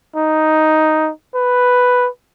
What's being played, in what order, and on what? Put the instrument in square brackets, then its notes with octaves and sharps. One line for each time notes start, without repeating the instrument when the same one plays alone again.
[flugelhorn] D#4
B4